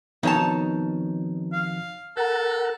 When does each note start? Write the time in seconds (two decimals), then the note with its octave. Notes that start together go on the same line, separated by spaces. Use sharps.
0.23 F2 B2 D#3 D#4 C#5 A5
1.53 F5
2.17 A4 A#4 F#5